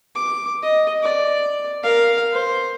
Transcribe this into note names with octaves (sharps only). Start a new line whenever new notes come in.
D6
D#5
D5
A#4 F5
C5